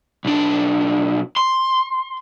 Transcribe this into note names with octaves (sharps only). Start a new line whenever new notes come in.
B1 D4
C6